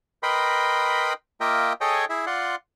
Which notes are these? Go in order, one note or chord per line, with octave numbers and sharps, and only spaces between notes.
A#4 B4 D#5 G5 B5 C6
A#3 F4 A#4 D#5 E5 G5
G#4 A4 C#5 D#5 G5 G#5
E4 G#4 E5
F4 D5 F#5 C6